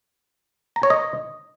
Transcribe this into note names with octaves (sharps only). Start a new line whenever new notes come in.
A#5
C#5
D#5